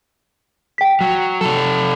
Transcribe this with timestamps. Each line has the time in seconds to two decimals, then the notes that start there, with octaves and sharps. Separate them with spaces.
0.78 G5 B6
1.01 F#3
1.41 C3 A4